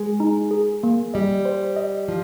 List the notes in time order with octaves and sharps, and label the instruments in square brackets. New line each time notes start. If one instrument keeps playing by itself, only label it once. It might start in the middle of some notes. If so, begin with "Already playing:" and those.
Already playing: [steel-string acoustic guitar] G#3 [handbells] G#4
[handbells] D#4
G#4
A#3
[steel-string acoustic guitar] G3 [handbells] D#5
[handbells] C5
D#5
[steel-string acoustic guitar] F3